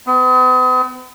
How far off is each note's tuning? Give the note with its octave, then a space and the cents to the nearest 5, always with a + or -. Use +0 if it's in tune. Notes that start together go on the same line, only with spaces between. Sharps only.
B3 +45